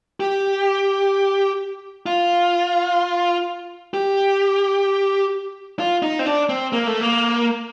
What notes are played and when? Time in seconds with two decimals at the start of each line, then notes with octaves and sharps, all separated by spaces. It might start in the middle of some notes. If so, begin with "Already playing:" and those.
0.20 G4
2.06 F4
3.94 G4
5.79 F4
6.02 D#4
6.19 C4
6.26 D4
6.49 C4
6.73 A#3
6.87 A3
7.01 A#3